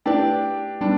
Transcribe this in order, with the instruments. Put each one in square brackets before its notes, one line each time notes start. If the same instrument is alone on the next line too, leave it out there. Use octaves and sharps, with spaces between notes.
[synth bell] A3 E4 B4 D5 [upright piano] D4 G4
[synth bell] G3 B3 [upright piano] D4